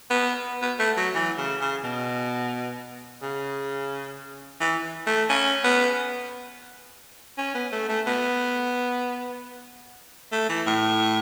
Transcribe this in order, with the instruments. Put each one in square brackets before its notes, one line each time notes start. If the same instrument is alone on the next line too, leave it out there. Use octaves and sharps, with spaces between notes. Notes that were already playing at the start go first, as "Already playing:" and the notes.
[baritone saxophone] B3
B3
A3
F#3
E3
C#3
C#3
B2
C#3
E3
A3
C#4
B3
C#4
B3
A3
A3
B3
A3
E3
A2